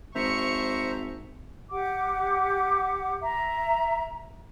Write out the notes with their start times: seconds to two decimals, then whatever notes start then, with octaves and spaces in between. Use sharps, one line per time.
0.15 G#1 C5 E5 A#5 C#6 C#7
1.71 G4 F#5 D6
3.21 E5 A#5